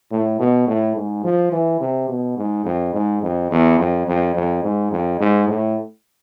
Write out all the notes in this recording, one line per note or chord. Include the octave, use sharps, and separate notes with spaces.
A2
B2
A2
G#2
F3
E3
C3
B2
G#2
F2
G#2
F2
E2
F2
F2
F2
G#2
F2
G#2
A2